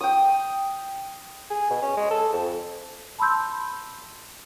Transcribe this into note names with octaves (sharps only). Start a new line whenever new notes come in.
G5 D#6
G#4
B2
C#4
G#3
A4
F2
A5 B5 C6 E6 G6